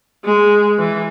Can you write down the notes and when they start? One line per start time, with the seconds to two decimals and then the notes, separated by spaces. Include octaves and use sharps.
0.25 G#3
0.79 E3